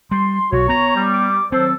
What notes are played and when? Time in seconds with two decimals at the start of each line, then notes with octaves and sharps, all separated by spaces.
0.11 G3 C6
0.52 B1 F#4 C#5
0.69 B3 A#5
0.95 G3
1.13 D6
1.52 D#3 F#3 C4 A4 C5